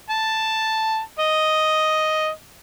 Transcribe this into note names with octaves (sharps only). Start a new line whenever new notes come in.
A5
D#5